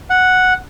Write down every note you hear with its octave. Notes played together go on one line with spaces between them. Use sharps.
F#5